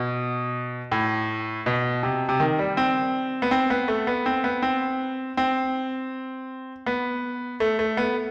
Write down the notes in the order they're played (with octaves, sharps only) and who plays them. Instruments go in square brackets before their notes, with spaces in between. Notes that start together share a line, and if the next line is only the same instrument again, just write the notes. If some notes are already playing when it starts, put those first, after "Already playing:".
Already playing: [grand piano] B2
A2
B2
C3
C3
D#3
G3
C4
B3
C4
B3
A3
B3
C4
B3
C4
C4
B3
A3
A3
B3